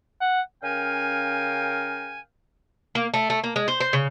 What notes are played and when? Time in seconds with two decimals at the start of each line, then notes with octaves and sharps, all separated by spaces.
0.21 F#5
0.63 C#3 C#4 A#4 F5 G5 G#5
2.95 A#3
3.14 A3
3.30 A3
3.44 A#3
3.56 G#3
3.68 C5
3.80 C5
3.93 C#3